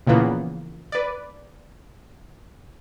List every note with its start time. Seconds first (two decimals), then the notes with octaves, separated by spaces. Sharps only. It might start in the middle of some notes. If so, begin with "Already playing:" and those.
0.07 A#2 C#3 E3 F3 A#3 B3
0.92 B4 D5